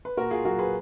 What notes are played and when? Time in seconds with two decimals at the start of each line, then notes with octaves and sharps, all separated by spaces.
0.05 B4
0.17 A#2 F#4 A#4
0.31 F4 G#4
0.45 F#3 F#4 A#4
0.59 G#4 B4